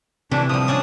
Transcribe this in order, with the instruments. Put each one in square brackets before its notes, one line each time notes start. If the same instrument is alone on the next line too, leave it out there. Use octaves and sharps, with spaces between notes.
[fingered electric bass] C3 [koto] E3 A3 E4 [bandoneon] D4
[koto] F3 G3 [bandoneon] D#6
[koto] C#4 D4 G#4